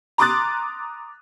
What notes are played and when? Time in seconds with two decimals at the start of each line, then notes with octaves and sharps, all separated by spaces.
0.18 A#5 C6 D6 D#6 F#6 A6